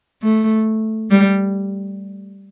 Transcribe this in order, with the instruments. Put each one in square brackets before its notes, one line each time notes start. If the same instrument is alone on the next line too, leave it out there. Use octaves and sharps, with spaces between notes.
[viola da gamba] A3
G3